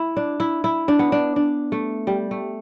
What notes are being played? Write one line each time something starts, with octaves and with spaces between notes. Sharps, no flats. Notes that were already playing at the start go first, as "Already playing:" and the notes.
Already playing: E4
D4
E4
E4
D4
B3
D4
D4
A3
G3
A3